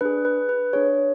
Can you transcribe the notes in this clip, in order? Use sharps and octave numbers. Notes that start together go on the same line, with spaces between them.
D4 G#4 B4
B4
B4
D4 G#4 C#5